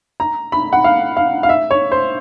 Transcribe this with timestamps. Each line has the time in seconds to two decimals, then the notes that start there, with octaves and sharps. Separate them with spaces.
0.20 A#5
0.52 B5
0.73 F#5
0.84 F5
1.17 F5
1.43 F5
1.49 E5
1.71 C#5
1.92 C5